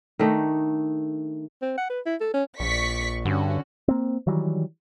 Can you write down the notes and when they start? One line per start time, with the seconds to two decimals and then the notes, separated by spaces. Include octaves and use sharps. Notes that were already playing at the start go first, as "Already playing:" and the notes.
0.19 D#3 A3 D4 D#4
1.62 C4
1.78 F#5
1.90 B4
2.06 E4
2.20 A4
2.34 C#4
2.60 A#1 D5 C#6 B6
3.25 G2 D3 C#4 F#4
3.88 A#3 C4
4.27 D#3 E3 F#3 G3